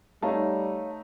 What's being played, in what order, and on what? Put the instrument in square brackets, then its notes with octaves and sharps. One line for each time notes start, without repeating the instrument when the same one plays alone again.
[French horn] G3 [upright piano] A3 D#4 [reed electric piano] C#5 F5 A5